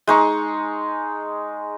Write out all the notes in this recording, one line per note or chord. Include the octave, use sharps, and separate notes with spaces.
G#3 D#4 C#6